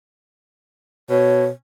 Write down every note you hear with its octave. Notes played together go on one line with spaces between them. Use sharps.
B2 C#5